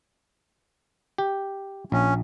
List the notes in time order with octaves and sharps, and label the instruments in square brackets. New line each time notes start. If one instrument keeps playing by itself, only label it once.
[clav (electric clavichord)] G4
[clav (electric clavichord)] A#1 [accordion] C#4